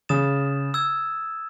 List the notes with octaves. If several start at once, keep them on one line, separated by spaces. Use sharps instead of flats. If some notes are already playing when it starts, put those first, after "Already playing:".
C#3 D#6 A6 E7
E6 G#6